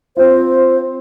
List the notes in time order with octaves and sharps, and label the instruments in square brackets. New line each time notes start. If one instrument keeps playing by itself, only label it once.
[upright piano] C4 F4 [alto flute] C5